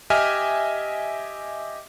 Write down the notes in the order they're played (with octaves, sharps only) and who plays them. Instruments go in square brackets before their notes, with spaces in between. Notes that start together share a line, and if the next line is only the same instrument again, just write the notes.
[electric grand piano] G4 D#5 E5 G#5 F6